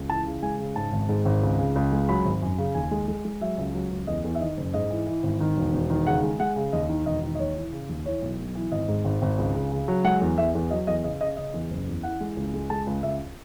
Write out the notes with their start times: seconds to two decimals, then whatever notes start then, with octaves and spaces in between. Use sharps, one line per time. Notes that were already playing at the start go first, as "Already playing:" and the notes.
Already playing: C#2
0.09 E3 A5
0.26 C#3
0.43 G#3 G#5
0.59 C#3
0.76 G#2 A5
0.92 G#1
1.09 G#2
1.25 G#1
1.42 C#2
1.59 C#3
1.75 C#2
1.92 G#3
2.08 F#3 B5
2.25 G#1
2.42 F#2
2.58 C#3
2.75 D#2 G#5
2.91 G#3
3.08 G#3
3.25 G#3
3.41 F#3 E5
3.58 C#2
3.74 F#3
3.91 C#2
4.07 E2 D#5
4.24 E2
4.35 E5
4.40 D#3 D#5
4.57 F#1
4.74 G#2 D#5
4.91 E3
5.07 E3
5.23 G#1
5.40 D#3
5.57 E1
5.73 E1
5.90 D#3
6.06 C#3 F#5
6.23 G#3
6.40 G#3 F#5
6.56 C#3
6.73 D#2 D#5
6.89 D#3
7.06 E1 D#5
7.23 D#3
7.35 D#5
7.39 D#2 C#5
7.56 E3
7.72 C#3
7.89 D#2
8.05 E3 C#5
8.22 B1
8.39 B1
8.55 E3
8.72 G#1 D#5
8.88 G#2
9.05 G#1
9.22 G#1
9.38 C#2
9.55 C#3
9.72 C#3
9.88 F#3
10.04 G#3 F#5
10.21 E2
10.38 E2 E5
10.55 E2
10.71 F#3 D#5
10.87 E2 D#5
11.04 C#3 D#5
11.21 C#3 D#5
11.37 C#3 D#5
11.54 E2
11.71 F#1
11.87 E2
12.03 E3 F#5
12.21 G#3
12.37 C#2
12.54 G#3
12.70 G#3 A5
12.87 C#2
13.03 C#2 E5